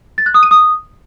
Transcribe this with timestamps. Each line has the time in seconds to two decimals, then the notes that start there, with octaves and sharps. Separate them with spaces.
0.18 A6
0.26 F#6
0.34 D#6
0.43 D#7
0.51 D#6